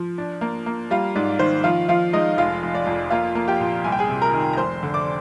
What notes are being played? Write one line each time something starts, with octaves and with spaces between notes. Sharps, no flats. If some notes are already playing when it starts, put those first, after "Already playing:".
Already playing: F3
D4
A#3
A#3
G3 F4 F5
G#2 D5
D#3 C5
F3 F4 F5
F3 F4 F5
G#3 D#4 D#5
F1 F4 F5
F1
D5
F2
A#3 F4 F5
A#3
G4 G5
A#2
C2 G#5
G5
G#4 G#5
C3
A#4 A#5
D#3
A#5
F1 C5 C6
D3
D5 D6